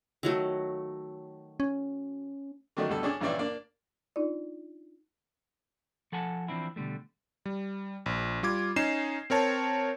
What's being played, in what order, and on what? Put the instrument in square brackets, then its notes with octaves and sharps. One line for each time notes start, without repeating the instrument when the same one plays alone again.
[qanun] D#3 F#3 A3
[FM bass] C#4
[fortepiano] D3 D#3 F#3 A3 D4 D#4
D2 B2 G3 A4
C#4 D4 G#4
A#1 G2 E3 C#4 D5 E5
A#3 D4 D5
[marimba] D4 D#4 F4 D5
[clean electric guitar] F3 A4 F#5 G#5 A5
E3 F3 C4 D4 E4
B2 D3 G3 A3
[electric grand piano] G3
A#1
G3 F4 D6 G#6
C#4 D#4 C7 E7
C4 A#4 C#5 A5